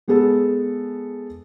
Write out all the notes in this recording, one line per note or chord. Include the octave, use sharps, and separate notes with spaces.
G#3 B3 G#4 A4